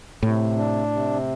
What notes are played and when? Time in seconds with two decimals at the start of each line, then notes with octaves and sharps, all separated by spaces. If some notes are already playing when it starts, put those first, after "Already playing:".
0.23 A2 C3
0.57 D4
0.91 C3